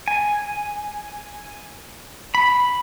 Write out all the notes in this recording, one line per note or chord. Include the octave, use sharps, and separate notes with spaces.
G#5
B5